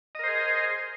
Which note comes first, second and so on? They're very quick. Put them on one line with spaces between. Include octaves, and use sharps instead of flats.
D#5 A#4 C5 G#4